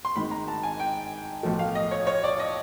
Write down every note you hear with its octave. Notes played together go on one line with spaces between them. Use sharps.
C6
G#1 G#2 D#3 G#3 B5
A#5
A5
G#5
G5
B1 A2 F3 A3
F5
D#5
C#5
C#5
D5
D#5